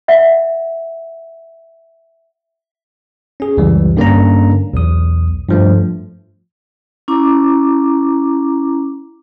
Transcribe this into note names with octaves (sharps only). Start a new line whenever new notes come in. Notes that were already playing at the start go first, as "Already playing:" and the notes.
E5 F#5
C#4 G#4
C#2 F#2 E3 G3
G2 D3 A#3 C#4 D4 A#5
B1 E2 D#6
G2 F3 A3
C#4 E4 A#5 D6